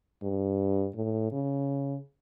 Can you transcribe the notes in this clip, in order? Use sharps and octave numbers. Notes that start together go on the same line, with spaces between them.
G2
A2
C#3